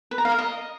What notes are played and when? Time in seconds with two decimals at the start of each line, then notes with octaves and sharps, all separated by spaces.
0.11 B4
0.18 A#5
0.25 F5
0.32 A#4
0.39 D#5